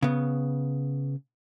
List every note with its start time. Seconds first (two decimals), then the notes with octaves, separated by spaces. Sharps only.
0.03 C#3 B3